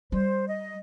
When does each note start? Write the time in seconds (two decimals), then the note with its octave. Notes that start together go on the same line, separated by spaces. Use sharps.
0.12 G3 C5
0.47 D#5